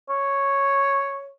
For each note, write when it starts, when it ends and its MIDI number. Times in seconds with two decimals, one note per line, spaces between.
0.10 1.30 73